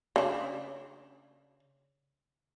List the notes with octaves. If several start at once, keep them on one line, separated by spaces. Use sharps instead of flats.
C#3 D4